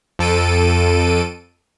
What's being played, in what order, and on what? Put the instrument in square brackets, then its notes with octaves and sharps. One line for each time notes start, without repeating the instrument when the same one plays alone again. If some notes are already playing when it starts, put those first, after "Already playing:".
[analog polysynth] F2 A4 D7 D#7